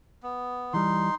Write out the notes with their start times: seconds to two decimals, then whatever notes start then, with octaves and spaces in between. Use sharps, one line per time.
0.23 B3
0.73 E3 G3 D#4 C6